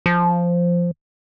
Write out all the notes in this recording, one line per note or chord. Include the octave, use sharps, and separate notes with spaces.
F3